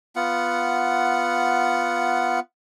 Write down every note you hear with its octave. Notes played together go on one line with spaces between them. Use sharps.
B3 F4 F#5